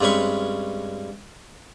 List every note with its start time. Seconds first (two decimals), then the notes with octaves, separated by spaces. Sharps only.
0.01 G2 G#3 C4 C#4 B4 C#6